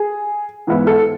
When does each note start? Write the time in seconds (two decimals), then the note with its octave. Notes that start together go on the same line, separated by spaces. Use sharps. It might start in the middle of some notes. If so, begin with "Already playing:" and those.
Already playing: G#4
0.67 G#2 E3 B3 E4
0.87 A4